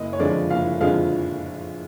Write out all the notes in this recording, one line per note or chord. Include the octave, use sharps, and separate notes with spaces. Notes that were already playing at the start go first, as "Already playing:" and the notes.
Already playing: F#1 D#5
C#5
F2 D3 F3 G#3 D5
F#1 F5
F2 D3 F3 G#3 F5